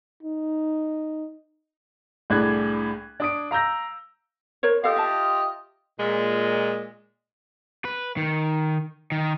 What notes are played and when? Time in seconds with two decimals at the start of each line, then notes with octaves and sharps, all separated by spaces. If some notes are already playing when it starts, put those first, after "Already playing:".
0.23 D#4
2.30 C2 A2 D4 G#4 F#6 G#6
3.20 D4 D#6 D7
3.51 F5 A#5 E6 G6 A#6
4.63 A#4 C5 C#5
4.84 F4 G4 A4 D#5 F5
4.97 E5 A5
5.98 A#2 G#3
7.85 B4
8.17 D#3
9.12 D#3